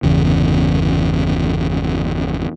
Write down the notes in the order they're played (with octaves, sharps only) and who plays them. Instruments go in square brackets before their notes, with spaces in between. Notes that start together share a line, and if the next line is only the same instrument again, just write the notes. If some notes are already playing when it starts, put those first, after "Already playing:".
[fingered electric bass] G1 E2 C#3